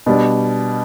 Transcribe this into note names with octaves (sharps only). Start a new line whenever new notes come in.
B2 G3 D4